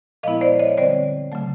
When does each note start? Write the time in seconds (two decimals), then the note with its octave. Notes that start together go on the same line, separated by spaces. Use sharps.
0.23 A#2 F3 G#3 B3 E4 D#5 F5
0.41 C5 D5
0.60 C#5 D#5
0.77 D3 G3 C4 C5 D5
1.32 C#3 F#3 A3